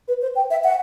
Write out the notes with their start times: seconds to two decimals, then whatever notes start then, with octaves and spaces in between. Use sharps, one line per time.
0.08 B4
0.22 C5
0.36 G5
0.51 E5
0.64 F#5